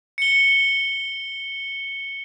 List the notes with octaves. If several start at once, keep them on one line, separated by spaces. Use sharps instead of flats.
C#7 G7